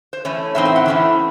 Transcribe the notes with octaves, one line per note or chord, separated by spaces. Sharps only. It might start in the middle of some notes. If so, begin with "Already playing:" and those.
C5
E3 A3 C#4 C#5
A2 E3 C4 D#4 E5
E5
F#5
E3 A3 C#4 E4